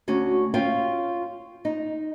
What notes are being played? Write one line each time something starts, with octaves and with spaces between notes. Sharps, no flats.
D2 C#4 F#4
C#4 F4 F5 G5
D#4